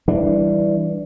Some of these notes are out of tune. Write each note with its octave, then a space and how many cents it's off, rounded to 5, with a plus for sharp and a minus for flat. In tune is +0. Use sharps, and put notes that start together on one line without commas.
E3 +0 G3 +0 D4 +0